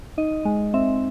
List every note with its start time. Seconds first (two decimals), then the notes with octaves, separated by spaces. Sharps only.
0.18 D#4 D#5
0.45 G#3
0.74 C4 E5